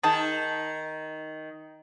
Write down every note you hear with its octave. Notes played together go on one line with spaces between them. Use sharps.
D#3 G#4 A5